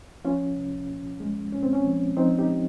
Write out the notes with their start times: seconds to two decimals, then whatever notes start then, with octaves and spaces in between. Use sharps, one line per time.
0.24 F3 C#4 F4
0.56 C2
0.89 A#2
1.20 G#3
1.53 A#2 C#4
1.63 C4
1.73 C#4
1.85 F3
2.17 F3 C4 D#4
2.38 D#4 G4